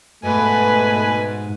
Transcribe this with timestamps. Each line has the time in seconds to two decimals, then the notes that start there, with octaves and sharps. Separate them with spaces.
0.24 G#2 B2 A3 B4 G#5